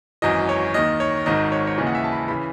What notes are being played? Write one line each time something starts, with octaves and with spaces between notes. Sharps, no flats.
G#1 F#2 E3 D#5
C#5
D#2 D#3 D#5
C#5
G#1 G#2 D#3 D#5
C#5
C#5
D#2 C#3 E3 D#5
F#5
E5
A5
B5
C#3 E3 B5